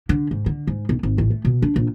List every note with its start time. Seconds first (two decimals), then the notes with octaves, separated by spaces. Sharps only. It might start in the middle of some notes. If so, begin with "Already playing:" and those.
0.09 D3
0.31 G#2
0.46 D3
0.67 G#2
0.89 B1
1.03 G#1
1.18 A1
1.30 A3
1.45 B2
1.62 D4
1.76 A#1